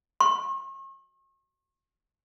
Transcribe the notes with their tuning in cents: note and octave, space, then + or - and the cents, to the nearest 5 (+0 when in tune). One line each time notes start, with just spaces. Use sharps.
C#6 -40